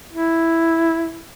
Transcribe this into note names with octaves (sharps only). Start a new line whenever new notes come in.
E4